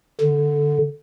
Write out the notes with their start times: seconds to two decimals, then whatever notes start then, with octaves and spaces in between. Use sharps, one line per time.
0.21 D3